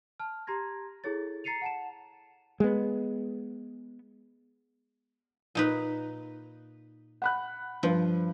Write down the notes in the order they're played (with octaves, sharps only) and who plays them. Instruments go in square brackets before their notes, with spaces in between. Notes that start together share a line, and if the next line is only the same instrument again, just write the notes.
[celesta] A5 F6
G4 A#5 C6 G#6 A#6
E4 G#4 A4 C#5 A6
A#5 A6 C7 C#7 D#7 F7
F#5 A5 E7
[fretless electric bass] G#3 B3
[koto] A#2 D#4 B4
[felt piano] F#5 B5 F#6
[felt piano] G2 B4 C5 [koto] F3